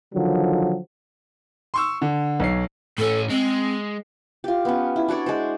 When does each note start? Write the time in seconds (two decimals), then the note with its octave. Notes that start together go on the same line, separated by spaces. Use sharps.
0.15 D3 D#3 F3 F#3
1.74 C6 C#6 E6
2.02 D3
2.40 B1 C#5 C7
2.98 A2 C#4 A4
3.30 G#3 C4
4.44 F4 G4
4.65 B3 C#4
4.96 E4
5.08 D4 F#4 C#5 D5
5.26 G#3 C5